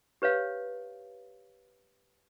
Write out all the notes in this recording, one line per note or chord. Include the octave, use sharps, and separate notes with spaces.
G4 B4 C#5 F5